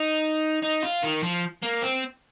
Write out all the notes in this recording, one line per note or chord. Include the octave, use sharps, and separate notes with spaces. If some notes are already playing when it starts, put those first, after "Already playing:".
Already playing: D#4
D#4
F4
D#3
F3
A#3
C4